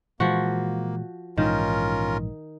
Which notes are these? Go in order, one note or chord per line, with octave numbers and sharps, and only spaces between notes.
A#2 E3 F3 G#3 A#3 F#4
A#1 G#2 D#3 E3 C#4 F4 A#4